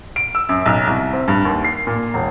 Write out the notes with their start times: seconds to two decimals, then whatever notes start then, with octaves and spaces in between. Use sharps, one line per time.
0.16 D7
0.35 E6
0.49 F#2
0.66 B1
0.87 C2
1.13 C4
1.28 G2
1.45 D#2
1.64 C7
1.87 A#2
2.14 E1